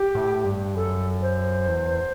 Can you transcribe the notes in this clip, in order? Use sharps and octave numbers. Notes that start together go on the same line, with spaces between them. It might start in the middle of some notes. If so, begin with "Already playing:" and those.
Already playing: G4
A2
G2
F#2 A4
C5
E2